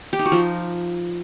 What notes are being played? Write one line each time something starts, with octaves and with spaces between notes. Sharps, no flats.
G4
D#4
F#4
F3